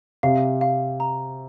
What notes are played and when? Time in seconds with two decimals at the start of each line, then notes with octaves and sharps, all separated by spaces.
0.23 C3 F5
0.61 F5
1.00 A#5